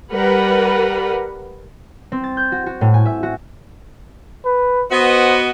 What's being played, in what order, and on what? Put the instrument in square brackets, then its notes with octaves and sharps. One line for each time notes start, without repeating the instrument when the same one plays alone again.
[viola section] G3 A#4 B4 F#5
[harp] C4
A6
G6
F#4
F#4
A2
G#5
E5
F#4
[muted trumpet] B4
[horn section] B3 F#4 D#5 [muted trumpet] C5